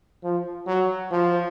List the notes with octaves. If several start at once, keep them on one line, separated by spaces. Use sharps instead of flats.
F3
F#3
F3